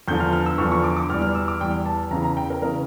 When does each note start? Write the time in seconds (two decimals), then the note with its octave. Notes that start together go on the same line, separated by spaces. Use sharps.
0.08 E2 D3 F3 G6
0.20 F6
0.33 F6
0.46 E6
0.58 E2 D3 F3 C#6
0.72 C#6
0.84 D6
0.97 D6
1.10 E2 E3 G3 F6
1.22 F6
1.35 E6
1.48 D6
1.61 E2 E3 G3 G5
1.86 A5
2.11 E2 C#3 E3 A#5
2.24 A#5
2.37 G5
2.50 A#4
2.62 C#3 E3 A#4